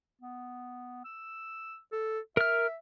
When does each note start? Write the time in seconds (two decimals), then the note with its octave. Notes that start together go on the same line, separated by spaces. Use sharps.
0.21 B3
1.05 E6
1.92 A4
2.37 A#4 E5 F6